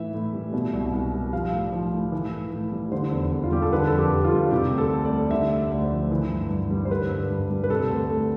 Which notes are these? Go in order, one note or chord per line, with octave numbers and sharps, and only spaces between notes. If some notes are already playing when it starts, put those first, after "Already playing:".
Already playing: A2 E3 E5
A2
G3
B2
C2
C2
G3
F3 F5
A2
F3
A2
E3
A2
A2
G3
D3 C5
E2
E2
F4
G3 G4
A4
D3 B4
A4
F2
G4
F2
F4
G3
C3 G4
D2
A4
D2
D5
G3
D3 E5
D2
D5
D2
C5
F3
E3
G2
G2
G3
C5
D3 B4
G2
G2
G3
B4
C3 A4
D2
D2